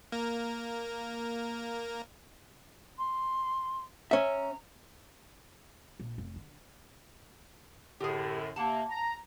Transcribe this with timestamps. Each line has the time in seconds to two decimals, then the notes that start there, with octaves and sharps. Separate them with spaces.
0.12 A#3 A#4
2.98 C6
4.11 C#4 E5 A#5
6.00 A#1
6.18 F1
6.36 D3
8.00 F#2 A2 D3 G4 G#4
8.56 C3 A#3 F#5 A5
8.89 A#5